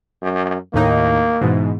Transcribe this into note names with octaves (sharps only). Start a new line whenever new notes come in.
F#2
D#2 A2 A#3 D#4
G#2 B2 E3